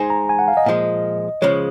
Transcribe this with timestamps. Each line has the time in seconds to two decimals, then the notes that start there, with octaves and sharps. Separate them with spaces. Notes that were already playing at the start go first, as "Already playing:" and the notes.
Already playing: G#3 D#4 G#4 C5 G#5
0.10 A#5
0.29 G#5
0.39 F#5
0.48 F5
0.57 D#5
0.66 A#2 F3 G#3
1.42 C#3 F3 G#3 C#5